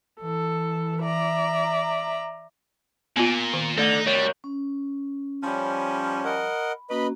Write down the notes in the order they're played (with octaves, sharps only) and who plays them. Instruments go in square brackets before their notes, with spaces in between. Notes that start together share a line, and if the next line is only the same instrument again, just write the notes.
[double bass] E3 [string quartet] A4
[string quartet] D5 E5 A#5
[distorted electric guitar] A#2 [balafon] B3 F4
[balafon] D#3
[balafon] A3 [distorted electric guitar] D#4 [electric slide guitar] A4 D5
[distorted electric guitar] G3 [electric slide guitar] A#4 C#5
[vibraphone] C#4
[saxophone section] F3 G3 C#4 [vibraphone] B5
[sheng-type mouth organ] A#4 D#5 F#5
[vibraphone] A#3 C#4 F#4 [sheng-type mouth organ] B4 D#5 B5